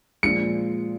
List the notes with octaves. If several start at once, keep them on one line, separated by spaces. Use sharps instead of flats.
A#2 F3 G#3 C#7